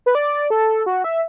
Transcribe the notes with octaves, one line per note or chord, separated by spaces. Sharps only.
B4
D5
A4
F#4
E5